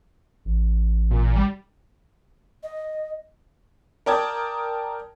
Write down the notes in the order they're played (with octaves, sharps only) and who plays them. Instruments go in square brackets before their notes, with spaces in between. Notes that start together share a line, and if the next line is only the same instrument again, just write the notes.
[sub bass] A1
[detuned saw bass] A#2
G3
[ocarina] D#5
[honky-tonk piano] A#4 D5 G5 A5 D#6 G#6